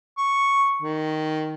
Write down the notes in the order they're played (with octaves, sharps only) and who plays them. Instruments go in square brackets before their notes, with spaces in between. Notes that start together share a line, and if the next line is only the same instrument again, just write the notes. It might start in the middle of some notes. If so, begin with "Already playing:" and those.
[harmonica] C#6
D#3